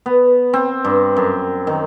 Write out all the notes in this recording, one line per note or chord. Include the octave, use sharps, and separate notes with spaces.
B3
C4
G2
F#2
D#3